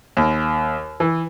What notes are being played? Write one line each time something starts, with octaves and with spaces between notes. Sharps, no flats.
D#2
E3